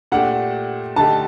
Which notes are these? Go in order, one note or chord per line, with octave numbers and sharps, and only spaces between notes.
A#2 A3 D4 G4 F#5
D3 A3 D#4 G4 A5